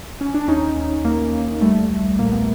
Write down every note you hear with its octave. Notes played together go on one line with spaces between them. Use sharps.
C#4
D4
D#2 C#4 D#4
D#2
D#2 A#3
D#2
G3 A3
B1
A#2 A#3
B3